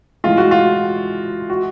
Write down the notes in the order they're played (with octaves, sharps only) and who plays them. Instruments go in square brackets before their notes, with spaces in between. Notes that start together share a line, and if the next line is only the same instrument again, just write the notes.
[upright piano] A2 E3 G#3 [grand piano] F4
[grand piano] F#4
F4
F#4